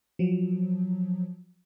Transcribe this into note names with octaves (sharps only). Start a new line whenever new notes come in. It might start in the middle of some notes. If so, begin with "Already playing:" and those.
F3 F#3